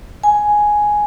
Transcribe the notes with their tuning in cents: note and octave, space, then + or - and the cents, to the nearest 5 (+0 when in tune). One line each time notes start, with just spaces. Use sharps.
G#5 +5